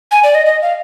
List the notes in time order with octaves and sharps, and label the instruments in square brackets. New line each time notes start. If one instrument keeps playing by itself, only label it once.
[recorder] G#5
D5
D#5
D#5
F5